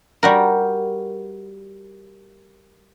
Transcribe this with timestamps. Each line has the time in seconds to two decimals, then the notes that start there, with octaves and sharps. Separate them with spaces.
0.23 G3 F#4 A#4